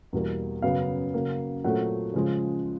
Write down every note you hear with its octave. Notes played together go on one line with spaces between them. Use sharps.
E2 B2 G3 A#3
F#2 C#3 F#3 B3 F5
C#3 F#3 A#3
A#2 F#3 A3 C4 F#5
C#3 F3 G#3